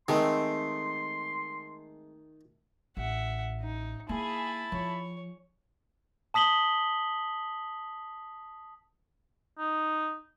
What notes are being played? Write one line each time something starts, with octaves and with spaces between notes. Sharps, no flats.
D#3 G#3 A3 C4 C6
A1 E5 F#5
D#4
A#3 E4 G#4 G#5 A5 B5
F3 C#5
A5 D#6 B6 F#7 G7
D#4